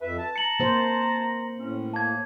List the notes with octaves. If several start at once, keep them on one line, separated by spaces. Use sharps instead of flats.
F2 B4 E5
A5
A#5 C#7 F#7
A#3 C5
A2 C#4
A#3 A5 G#6